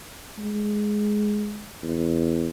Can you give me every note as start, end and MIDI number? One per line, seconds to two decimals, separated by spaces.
0.38 1.73 56
1.83 2.49 40